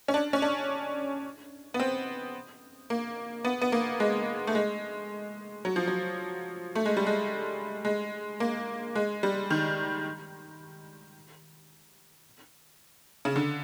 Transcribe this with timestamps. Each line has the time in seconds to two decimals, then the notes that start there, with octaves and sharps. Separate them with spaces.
0.08 C#4
0.14 D4
0.33 C#4
0.42 D4
1.74 B3
1.80 C4
2.90 A#3
3.45 B3
3.61 B3
3.72 A#3
4.00 G#3
4.47 A3
4.55 G#3
5.65 F#3
5.76 F3
5.87 F#3
6.75 A3
6.85 G#3
6.97 G3
7.07 G#3
7.85 G#3
8.40 A#3
8.95 G#3
9.23 G3
9.51 D#3
13.25 C#3
13.36 D3